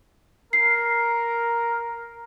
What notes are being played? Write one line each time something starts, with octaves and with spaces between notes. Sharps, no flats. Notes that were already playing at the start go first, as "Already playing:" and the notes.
A#4 C7